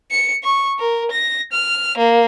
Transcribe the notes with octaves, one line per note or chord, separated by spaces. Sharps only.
C#7
C#6
A#4
A#6
F6
A#3